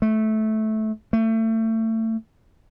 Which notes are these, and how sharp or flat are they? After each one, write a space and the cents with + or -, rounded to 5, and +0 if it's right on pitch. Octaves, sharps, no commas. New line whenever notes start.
A3 -15
A3 +30